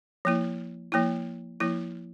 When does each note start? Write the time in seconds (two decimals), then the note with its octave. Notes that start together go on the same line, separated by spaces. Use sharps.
0.25 F3 A#3 E4
0.92 F3 A#3 E4
1.60 F3 A#3 E4